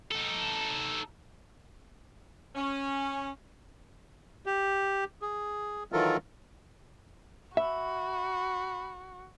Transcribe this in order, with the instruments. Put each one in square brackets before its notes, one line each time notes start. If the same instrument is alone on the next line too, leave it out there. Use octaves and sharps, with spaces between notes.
[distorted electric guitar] D#4 A4
[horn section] C#4
[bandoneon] G4
G#4
D#3 E3 F#3 F4 A4 A#4
[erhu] F#4 [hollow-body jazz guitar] E5 [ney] B5